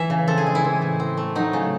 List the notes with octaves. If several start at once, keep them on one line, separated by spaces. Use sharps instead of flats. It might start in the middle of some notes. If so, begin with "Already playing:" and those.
Already playing: E3 E5
C#3
C4 A4
G#4
G#3
E4
E3
A2
C4
A3
F#3 D#4
C#3